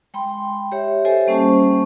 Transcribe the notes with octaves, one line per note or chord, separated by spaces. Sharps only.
G#3 G5 B5 C6
G4 C#5 E5
G4 A4 C5 D#5 E5 G#5
G3 A#3 C#4 C5 A5 C#6